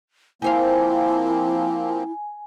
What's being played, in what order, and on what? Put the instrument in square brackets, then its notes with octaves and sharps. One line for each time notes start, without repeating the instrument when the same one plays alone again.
[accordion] F3 A#3 C4 [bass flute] E4 [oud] G4 C5 F5 [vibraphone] G#5